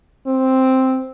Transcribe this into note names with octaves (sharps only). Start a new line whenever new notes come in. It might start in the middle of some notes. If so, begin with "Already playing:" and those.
C4